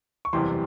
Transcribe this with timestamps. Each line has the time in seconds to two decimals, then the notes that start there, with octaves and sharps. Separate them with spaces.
0.25 C#6
0.33 F#1 E2 C3 E3 G3 C6